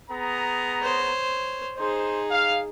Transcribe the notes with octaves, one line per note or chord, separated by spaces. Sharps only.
B3 G#4 A#5
C5 C#5
D#4 G#4 C5
F5